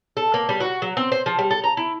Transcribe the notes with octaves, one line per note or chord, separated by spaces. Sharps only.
A4
A#3
G3
F#4
F#3
C4
C5
F3
G3
A4
A#5
E4